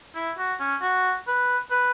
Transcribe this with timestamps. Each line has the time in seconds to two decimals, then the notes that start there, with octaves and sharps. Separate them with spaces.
0.15 E4
0.38 F#4
0.60 C#4
0.82 F#4
1.27 B4
1.71 B4